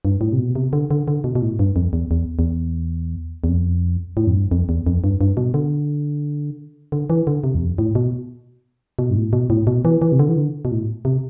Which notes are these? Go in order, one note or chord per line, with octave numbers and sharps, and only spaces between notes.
G2
A2
C3
B2
C3
D3
D3
D3
B2
B2
A2
G2
F2
E2
E2
E2
E2
F2
A2
F2
G2
F2
E2
F2
G2
G2
B2
D3
D3
E3
D3
C3
E2
F2
A2
B2
B2
G2
A2
B2
A2
B2
E3
E3
C3
D3
E3
D3
B2
A2
C3